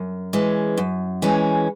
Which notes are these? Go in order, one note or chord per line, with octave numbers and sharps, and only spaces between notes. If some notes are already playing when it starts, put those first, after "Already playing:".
Already playing: F#2
E3 G#3 C#4
F#2
E3 G#3 C#4